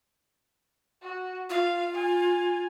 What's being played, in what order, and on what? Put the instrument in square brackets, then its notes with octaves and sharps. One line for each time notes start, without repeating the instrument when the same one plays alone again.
[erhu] F#4
[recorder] F4 [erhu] F5
[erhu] G#5